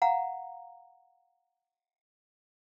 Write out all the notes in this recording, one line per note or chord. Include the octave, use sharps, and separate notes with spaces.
F5 F#5 A#5